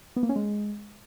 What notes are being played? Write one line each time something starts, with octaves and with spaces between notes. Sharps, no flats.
B3
A#3
C#4
G#3